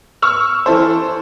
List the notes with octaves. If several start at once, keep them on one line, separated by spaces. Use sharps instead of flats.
C#6 E6 F6
E3 A4 C5